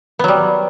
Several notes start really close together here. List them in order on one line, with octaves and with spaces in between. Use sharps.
B3 F#3 G3